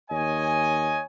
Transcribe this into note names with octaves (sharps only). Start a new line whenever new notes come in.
D#2 C#5 D#5 G#5